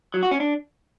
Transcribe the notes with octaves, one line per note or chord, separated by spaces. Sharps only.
F#3
F#4
C#4
D4